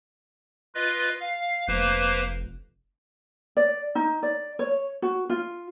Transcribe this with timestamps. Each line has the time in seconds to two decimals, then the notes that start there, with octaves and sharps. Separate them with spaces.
0.75 F4 B4 D#5
1.20 F5
1.68 F1 A#3 B4 C5
3.57 D5
3.95 D#4
4.23 D5
4.59 C#5
5.02 F#4
5.30 F4